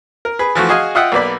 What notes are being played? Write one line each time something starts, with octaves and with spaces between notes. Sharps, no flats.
A#4
G#4 B4
E3 F3 A3 F#4
F#4 G#4 D#5 F5 G#5
F4 D#5 E5 F#5 G5
B1 A#3 B4 D5 B5